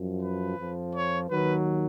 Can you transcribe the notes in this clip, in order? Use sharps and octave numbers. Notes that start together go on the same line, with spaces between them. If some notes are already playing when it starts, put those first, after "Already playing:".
Already playing: F#2 F3
B4
F2 F3
C#5
D#2 D#3 F#3 B4